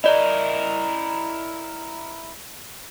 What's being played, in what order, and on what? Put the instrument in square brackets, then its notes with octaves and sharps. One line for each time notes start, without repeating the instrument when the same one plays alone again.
[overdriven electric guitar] E4 A#4 [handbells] D5 D#5